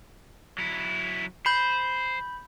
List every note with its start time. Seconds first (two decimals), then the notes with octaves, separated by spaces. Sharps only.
0.58 F#3 E4
1.46 C5 B5 G6